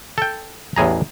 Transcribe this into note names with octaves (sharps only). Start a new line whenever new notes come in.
A4 G5
A1 E2 A2 G#4 A#5